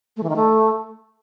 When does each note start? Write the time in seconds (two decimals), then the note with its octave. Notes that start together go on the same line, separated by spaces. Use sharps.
0.17 A3
0.23 E3
0.29 D#3
0.36 A3